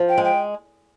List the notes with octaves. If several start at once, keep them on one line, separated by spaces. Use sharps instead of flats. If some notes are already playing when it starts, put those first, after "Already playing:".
Already playing: F3
G5
G#3
G5